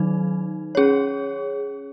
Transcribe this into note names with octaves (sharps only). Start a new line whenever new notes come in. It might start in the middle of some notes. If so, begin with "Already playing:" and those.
Already playing: D#3 F#3 D#4
C#4 G#4 C#5